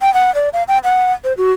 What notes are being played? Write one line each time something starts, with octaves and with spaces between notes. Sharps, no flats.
G5
F#5
D5
F5
G5
F#5
C5
F#4